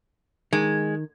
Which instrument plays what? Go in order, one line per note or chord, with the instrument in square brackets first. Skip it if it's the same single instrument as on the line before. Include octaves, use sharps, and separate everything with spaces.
[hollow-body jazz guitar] D#3 [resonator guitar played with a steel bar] G#3